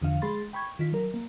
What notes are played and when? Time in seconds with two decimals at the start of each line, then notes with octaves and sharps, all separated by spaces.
0.02 E2 D3 F3 F5
0.22 G#3 G#4 B5 C6 A6
0.53 G5 B5 C#6 G#6
0.79 D#3 F4 B6
0.92 F#3 A#4
1.14 A#3